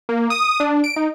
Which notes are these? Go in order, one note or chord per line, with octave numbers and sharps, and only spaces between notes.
A#3
D#6
D4
D7
D#4